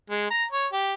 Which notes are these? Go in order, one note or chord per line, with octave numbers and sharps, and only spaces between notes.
G#3
A#5
C#5
G4